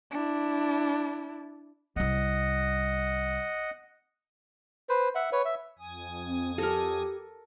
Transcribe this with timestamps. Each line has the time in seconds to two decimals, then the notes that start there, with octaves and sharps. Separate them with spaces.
0.11 D4 E4
1.96 C2 G3 D#5 F#5
4.89 B4 C5
5.15 E5 F#5
5.32 B4 C#5
5.45 E5
5.79 F2 G#5 D#6
6.27 C4
6.58 G4 A4 A#4